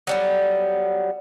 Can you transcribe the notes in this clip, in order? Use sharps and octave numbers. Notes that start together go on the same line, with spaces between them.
F#3 G3 B3